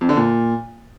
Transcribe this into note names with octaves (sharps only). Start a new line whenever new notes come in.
F2
D3
A#2